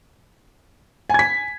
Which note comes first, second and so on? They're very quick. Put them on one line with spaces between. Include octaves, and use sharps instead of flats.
G#5 G#6 B6